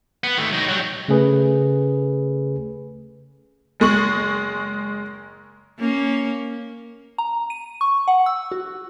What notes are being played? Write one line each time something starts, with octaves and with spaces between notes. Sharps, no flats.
B3 B4
D#3 A3
F#3 D#4
F#3 G3
C#3 A3 C#4 G#4 B4
F#1 G#3 C#6 F#7
A#3 C#4
A#5
D#7
C#6
F#5
E6
F#4